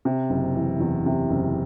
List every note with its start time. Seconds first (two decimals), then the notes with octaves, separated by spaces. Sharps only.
0.05 C3
0.30 F#1
0.56 E3
0.80 E2
1.06 C3
1.30 F#1